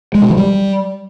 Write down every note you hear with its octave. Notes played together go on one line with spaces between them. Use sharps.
G#3
B2
E3
G3